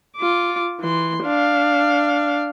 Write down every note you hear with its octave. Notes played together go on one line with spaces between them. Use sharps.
F4 D6
E3 C6
D4 F5